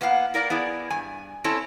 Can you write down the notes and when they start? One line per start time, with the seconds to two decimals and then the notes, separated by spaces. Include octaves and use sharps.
0.01 A#3 B3 E4 F5 F#5
0.34 E4 A#4 D5 F5
0.50 B3 E4 G#4 D5
0.90 G2 G#5
1.44 C4 C#4 E4 A4 C#5